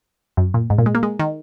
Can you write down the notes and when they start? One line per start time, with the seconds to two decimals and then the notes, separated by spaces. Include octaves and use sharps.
0.37 F#2
0.54 A#2
0.70 G#2
0.78 A#2
0.86 G#3
0.95 A#3
1.03 G#3
1.19 D#3